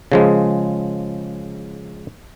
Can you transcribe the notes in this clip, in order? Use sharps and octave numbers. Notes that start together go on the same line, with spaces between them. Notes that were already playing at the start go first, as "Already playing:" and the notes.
C#3 F3 G#3